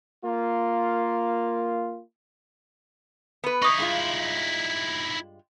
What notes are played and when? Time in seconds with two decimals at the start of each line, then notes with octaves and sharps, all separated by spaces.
0.24 A#3 F4
3.44 B3 B4
3.62 D#4 E4 C#6 D#6
3.78 G2 G#3 F4